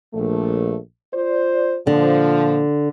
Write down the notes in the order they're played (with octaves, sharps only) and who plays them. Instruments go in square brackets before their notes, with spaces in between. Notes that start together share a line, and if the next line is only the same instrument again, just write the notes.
[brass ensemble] A#1 A3
F4 C5 D5
[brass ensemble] A#2 F3 [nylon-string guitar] D3